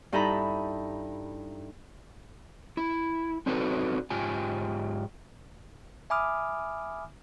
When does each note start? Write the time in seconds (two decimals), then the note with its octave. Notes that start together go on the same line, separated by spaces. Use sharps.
0.12 G2 D#4 E4 A4 A#5 B5
2.77 E4
3.46 C4 D4 D#4 F#4 A4 B4
4.10 G#2 F4 G4 G#5
6.10 E5 G#5 B5 D6 D#6 F6